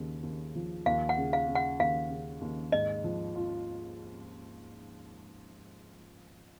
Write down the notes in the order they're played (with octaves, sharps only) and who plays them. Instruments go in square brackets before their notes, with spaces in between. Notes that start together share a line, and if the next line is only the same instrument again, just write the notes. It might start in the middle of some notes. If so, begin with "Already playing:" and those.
Already playing: [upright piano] D#2 C#3
D#2
F3
[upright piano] D#2 [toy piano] F5
[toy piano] F#5
[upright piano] C#3
[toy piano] F5
[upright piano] C#3
[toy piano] F#5
[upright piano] D#2 [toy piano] F5
[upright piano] C#3
D#2
[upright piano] G#2 [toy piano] D#5
[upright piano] F3
F4